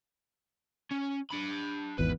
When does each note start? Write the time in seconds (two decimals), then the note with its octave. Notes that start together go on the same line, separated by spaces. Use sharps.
0.92 C#4
1.31 D4 B5
1.99 G#1 E2 B4